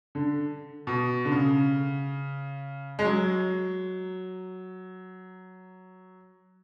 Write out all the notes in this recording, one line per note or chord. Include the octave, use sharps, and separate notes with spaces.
D3
B2
D3
C#3
G#3
F#3